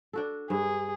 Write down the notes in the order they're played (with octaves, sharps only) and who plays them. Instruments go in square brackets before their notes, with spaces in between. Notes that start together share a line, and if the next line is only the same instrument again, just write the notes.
[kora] D4 F#4 A4
[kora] G2 [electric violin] G#4